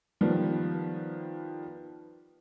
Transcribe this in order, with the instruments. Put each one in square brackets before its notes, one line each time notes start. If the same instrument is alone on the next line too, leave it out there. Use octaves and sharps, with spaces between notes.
[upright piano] D#3 F3 G3 B3